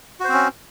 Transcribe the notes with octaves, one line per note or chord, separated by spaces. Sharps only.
C4 C#4 F#4 C5